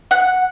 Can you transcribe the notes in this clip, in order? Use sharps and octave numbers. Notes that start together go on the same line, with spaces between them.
F#5